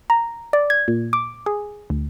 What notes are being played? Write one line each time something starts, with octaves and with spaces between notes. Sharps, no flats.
A#5
D5
G#6
A#2
D6
G#4
D2